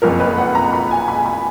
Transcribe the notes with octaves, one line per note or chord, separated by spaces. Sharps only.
F#1 F2 F3 A#4
B4
F#5
A#5
B5
G#5
B5
B5